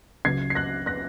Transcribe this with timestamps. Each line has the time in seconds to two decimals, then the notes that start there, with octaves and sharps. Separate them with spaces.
0.25 C#2 C#3 F#3 G#6 C7
0.50 C7
0.55 F#6 A#6
0.86 F#6 A#6